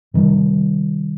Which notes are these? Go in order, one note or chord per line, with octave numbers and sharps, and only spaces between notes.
C3 D#3 G3